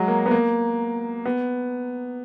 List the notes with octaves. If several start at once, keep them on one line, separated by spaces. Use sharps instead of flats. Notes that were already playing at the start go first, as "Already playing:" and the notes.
Already playing: F#3 G#3
A#3
B3
A#3
B3